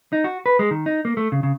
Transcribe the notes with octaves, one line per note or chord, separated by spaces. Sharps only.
D#4
F#4
B4
G#3
D#3
D#4
A#3
A3
C#3
C#3